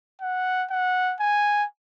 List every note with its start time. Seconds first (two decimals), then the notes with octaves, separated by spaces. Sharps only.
0.21 F#5
0.70 F#5
1.20 G#5